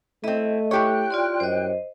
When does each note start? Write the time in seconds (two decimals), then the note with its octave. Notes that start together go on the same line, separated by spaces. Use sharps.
0.24 A3 C4 E4 D#5
0.71 E4 G4 C#5 G5 F#6
1.11 F4 D5 C6
1.40 F#2 C5 D#5